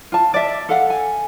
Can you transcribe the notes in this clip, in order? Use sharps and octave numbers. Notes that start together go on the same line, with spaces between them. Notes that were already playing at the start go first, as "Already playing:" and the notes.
F4 A5
D5 E5
A4 F5 F#5
G#5